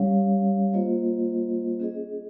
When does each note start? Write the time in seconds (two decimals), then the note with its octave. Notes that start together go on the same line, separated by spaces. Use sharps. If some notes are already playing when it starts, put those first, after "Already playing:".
Already playing: G3 C#4 G4 C#5 F5
0.73 A#3 F4 C5 D#5
1.80 C#4 G#4 D#5